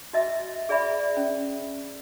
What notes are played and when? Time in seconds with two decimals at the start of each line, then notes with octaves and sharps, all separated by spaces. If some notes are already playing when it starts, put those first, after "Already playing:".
0.13 F#4 D#5 E5
0.69 G#4 D5 E5 B5
1.17 C#4